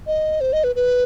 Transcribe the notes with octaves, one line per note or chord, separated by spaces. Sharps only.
D#5
C5
D#5
B4
B4